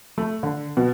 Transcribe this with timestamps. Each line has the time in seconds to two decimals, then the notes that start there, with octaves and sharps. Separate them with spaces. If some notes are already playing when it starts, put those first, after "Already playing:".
0.18 A3
0.43 D3
0.77 B2